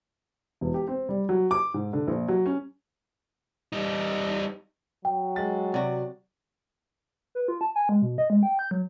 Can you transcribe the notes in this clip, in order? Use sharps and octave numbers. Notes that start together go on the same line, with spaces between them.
E1
G4
C4
G3
F#3
D6
G#2
D3
A#1
F#3
C#4
G3 D#4
F#3 G5
G#3 A6
C3 F#4 D5
B4
F4
A5
G#5
G#3
B2
D#5
G#3
G5
G6
F#3